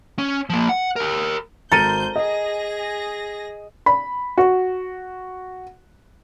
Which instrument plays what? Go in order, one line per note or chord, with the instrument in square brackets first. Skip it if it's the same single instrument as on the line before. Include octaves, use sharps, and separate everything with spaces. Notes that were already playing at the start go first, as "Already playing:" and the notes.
[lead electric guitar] C#4
F3 A#3
F#5
G4 A#4
[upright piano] G#1 A#5 D#7 [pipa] A4 A#4 [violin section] C5 G6
[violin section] G#4 A#6 [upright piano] D#5
[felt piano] B5
F#4